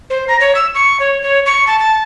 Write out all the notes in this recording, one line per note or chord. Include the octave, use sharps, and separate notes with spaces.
C5
A#5
C#5
E6
C#6
C#5
C#5
C#6
A5
A5